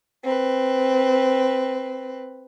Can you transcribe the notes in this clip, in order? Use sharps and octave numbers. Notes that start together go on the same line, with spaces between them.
C4 B4